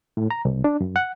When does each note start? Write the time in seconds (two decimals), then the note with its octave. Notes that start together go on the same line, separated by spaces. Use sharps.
0.17 A2
0.31 A#5
0.45 C2
0.64 D4
0.81 F#2
0.96 F#5